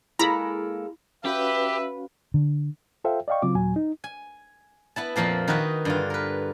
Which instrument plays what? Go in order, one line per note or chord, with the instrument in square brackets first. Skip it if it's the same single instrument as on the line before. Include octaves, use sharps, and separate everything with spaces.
[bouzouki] G#3 A#3 A4 [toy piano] E4 [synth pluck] A#5 B5
[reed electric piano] C#4 F#4 F5 [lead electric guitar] G4 [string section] B4 [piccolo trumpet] E5
[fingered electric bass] D3
[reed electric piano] F4 A4 C5 E5 F5 G5
D5 D#5 F5 G5 C#6
C#3 F#3 C4 F4 D6
D#2 A#2 F#3 G#5
D#4
[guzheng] G#5
B3 E4 A5
F2 A#2 F3 A#3 A5
D#3 D#4 F#4 B4
G2 D3 F4
A#4 B4